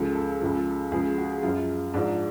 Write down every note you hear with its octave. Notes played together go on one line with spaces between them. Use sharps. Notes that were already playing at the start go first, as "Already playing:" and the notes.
Already playing: C#2 C#3 F3 A4
A4
C#2 C#3 F3
C#2 C#3 F3 G#4
F#4
F#2 F3 F4
G#2 F3 D4